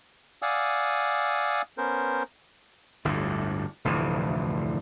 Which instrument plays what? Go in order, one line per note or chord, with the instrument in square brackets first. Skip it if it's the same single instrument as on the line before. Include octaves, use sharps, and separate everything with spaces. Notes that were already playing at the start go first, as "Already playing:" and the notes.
[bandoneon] D5 F5 F#5 G#5 D#6 E6
B3 C#4 A#4 C5
[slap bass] G1 D2 A2
F1 D2 A2 E3